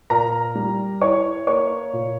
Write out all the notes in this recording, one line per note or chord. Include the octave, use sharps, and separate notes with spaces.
A#2 A#4 A#5
G3
E4 C#5 C#6
A#3 C#5 C#6
A#2